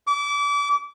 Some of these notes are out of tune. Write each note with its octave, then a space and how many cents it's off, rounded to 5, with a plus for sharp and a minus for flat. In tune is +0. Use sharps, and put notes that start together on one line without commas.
D6 -30